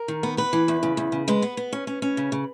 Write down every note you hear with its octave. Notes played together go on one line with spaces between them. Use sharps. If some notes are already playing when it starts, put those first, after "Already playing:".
Already playing: A#4
D#3
B3
B3 B4
E3
E2
C#3
E2
C#3
G#3 B4
B3
B3
C#4
C#4
C#4
C#3
C#3